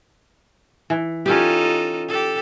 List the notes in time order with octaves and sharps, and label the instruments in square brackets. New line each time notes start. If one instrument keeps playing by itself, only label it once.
[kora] E3
[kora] C#4 G4 [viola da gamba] D#4 F4 A4
[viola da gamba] G4 A4